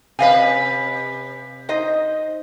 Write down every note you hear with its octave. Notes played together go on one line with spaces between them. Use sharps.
C3 B4 D#5 F5 G#5
D#4 C5 D#5